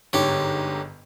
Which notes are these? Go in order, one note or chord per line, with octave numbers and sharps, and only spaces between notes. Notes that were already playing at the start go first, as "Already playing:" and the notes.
G1 G#2 D3 G4 C#5